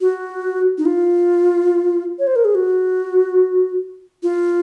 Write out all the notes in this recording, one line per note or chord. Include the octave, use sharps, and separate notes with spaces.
F#4
D#4
F4
C#5
C5
A#4
G#4
F#4
F4